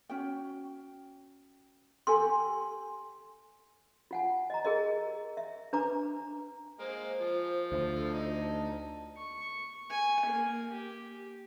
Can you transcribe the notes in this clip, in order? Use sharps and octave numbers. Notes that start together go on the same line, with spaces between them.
C#4 F#4 G5
G4 A4 G#5 C6
F4 F#5 G#5
D#5 A#5
G#4 A#4 D#5
E5
D4 B4 A#5 D6
G#3 A#3 C5
F3
D2
A4
D#4
A5
C#6
G#5
A#3
G4